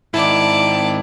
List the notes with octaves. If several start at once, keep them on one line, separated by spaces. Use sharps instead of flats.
G#2 D#3 E4 D5 A5